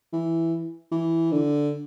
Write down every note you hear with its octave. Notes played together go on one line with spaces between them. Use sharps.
E3
E3
D3